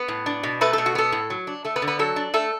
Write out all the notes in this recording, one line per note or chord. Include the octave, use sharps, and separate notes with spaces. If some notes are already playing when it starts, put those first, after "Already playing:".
Already playing: B3 B4
A2
D4
B2
A3 B4
B2 A4
F#4
B3 A4
A2
F#3
D4
A3 A4
B3 B4
D3
B3 B4
F#3 A4
D4
A3 A4